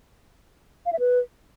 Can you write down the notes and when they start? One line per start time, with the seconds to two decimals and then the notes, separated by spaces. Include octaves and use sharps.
0.86 F5
0.93 E5
0.99 B4